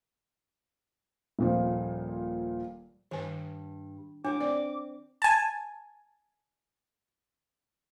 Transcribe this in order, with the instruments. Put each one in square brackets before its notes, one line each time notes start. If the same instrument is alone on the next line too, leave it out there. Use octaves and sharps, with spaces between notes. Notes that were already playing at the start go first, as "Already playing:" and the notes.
[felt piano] D#1 A#2 F3
[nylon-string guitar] G2 [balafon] D#3 G#5
[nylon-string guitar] D#3 F#3 [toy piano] D4 [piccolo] D6
[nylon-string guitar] C4 [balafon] D5
[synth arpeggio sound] G#5 A5